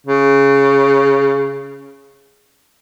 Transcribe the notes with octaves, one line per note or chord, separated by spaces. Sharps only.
C#3